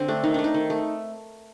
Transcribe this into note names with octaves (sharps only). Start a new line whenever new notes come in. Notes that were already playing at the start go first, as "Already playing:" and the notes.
Already playing: D3 C4 C5
A3 D4
D#3 D#4
A3 D4
D#4
D#3
A3